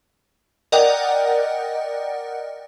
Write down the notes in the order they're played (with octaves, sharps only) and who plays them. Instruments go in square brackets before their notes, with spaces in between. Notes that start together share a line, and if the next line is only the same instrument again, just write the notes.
[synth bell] A#4 D5 D#5 F#5 G5